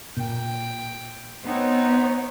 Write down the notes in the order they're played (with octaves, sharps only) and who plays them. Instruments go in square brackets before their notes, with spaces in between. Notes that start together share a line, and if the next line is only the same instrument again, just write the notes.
[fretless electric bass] A#2 [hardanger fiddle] G5
[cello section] B3 C#5 [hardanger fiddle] C4 D#4